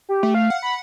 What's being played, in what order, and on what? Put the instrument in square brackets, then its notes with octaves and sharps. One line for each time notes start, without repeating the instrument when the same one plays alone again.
[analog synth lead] G4
[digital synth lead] A3
[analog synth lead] F5
[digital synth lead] F#5
[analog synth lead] B5